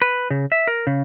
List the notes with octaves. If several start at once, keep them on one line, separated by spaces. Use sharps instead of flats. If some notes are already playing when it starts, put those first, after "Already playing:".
B4
C#3
E5
A#4
C#3